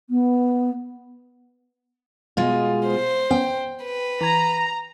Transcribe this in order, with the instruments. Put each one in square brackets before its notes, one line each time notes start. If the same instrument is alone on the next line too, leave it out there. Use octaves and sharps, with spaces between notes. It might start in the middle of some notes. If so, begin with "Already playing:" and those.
[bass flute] B3
[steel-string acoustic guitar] B2 G#3 F4
[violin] C5
[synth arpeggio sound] B3 C#4 [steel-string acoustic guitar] G5
[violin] B4
[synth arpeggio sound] E3 G#6 [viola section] A#5